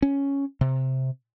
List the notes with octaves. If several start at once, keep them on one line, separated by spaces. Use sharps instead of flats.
C#4
C3